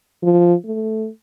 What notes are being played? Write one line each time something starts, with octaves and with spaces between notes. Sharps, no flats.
F3
A3